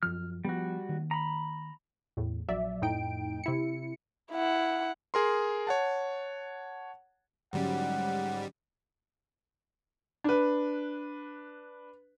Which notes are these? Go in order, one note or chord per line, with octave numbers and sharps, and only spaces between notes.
F#2 F3 F6
F3 G3 B3 F#4
D#3 A#3
A#5 B5
E2 A2
A#1 F#3 D5 E5
F2 A2 D#4 G5 D7
C3 E4 C#7
E4 F#5
G#4 A#4 C6
C#5 F#5 A5
G#2 D3 F#3 G3 C#4 F#5
D4 B4